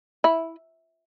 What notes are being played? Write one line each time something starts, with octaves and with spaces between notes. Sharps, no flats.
E4